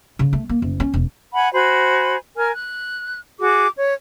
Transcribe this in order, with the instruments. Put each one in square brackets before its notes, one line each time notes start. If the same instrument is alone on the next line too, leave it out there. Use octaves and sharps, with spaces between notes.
[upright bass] C#3
A3
A#3
F#1
C#4
E1
[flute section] F#5 G#5 B5
F#4 C5 G#5 B5
A#4 G#5 F6
F#6
F#4 G#4 D6
C#5